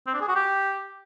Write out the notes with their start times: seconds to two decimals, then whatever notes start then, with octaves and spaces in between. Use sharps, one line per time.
0.07 C4
0.14 D4
0.21 G#4
0.28 F#4
0.35 G4